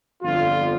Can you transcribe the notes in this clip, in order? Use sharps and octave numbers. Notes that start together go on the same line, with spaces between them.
G1 F2 D3 F3 F4